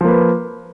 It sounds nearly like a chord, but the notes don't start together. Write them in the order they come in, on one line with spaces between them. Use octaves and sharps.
F3 A#3 B4